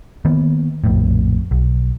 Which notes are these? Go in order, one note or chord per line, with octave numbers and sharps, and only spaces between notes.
D#3 A#3 B3
A#1 F2 A2
B1